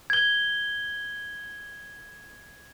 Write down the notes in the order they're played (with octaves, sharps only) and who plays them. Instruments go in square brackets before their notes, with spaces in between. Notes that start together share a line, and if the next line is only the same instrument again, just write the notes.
[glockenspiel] G#6 G7